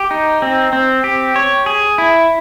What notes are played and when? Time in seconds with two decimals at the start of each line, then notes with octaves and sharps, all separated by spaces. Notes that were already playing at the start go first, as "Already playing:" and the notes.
Already playing: G4
0.11 D#4
0.42 C4
0.73 C4
1.04 G4
1.36 C#5
1.66 G#4
1.98 E4